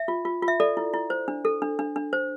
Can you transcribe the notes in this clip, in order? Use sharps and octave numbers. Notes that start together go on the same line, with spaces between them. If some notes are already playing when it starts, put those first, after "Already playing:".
Already playing: E5
F4
F4
F4
E5
A4 D5
E4
E4
C5
D4
A4
D4
D4
D4
C5